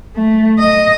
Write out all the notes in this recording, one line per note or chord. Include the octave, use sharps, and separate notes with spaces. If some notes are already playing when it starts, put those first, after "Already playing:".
A3
D#5